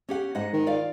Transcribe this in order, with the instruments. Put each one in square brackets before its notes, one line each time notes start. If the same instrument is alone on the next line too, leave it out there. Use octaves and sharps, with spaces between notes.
[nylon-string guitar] C#4 G4 F#5
G#2 D#5 F#5
[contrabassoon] D#3
[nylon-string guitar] F4 D5 F5